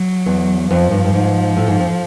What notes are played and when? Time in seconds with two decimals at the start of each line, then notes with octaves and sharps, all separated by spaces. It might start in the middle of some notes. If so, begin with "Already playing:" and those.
Already playing: F#3
0.26 E2
0.71 F2 F3
0.91 G2
1.05 G2
1.14 G#2
1.57 A2
1.68 G#2
1.80 F2